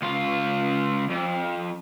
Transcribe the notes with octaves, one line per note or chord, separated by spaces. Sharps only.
C#2 F4
F2